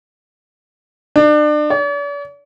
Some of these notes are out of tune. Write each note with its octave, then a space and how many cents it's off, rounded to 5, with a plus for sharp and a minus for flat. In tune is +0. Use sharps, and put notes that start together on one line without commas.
D4 +35
D5 -45